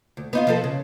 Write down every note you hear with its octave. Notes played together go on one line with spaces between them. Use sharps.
D2
B3 D#4 F4
F3 B3 A4
C#3